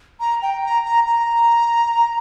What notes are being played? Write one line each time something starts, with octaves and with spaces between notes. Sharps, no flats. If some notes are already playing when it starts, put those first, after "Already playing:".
A#5
G5
A#5
A#5
A#5